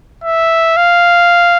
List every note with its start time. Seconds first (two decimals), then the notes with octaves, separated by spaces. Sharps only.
0.24 E5
0.77 F5